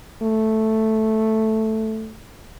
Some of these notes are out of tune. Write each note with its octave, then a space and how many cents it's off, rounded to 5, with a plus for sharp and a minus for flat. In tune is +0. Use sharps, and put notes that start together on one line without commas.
A3 +0